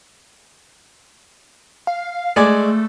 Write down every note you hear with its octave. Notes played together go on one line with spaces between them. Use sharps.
F5
G#3 A3 D5 G#5